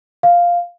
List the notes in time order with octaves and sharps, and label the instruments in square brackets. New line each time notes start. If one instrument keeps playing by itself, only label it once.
[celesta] F5